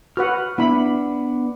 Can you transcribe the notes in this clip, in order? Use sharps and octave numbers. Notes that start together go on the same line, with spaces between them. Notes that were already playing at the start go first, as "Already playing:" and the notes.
F#4 B4 F#5 F6
B3 D4 E4 B5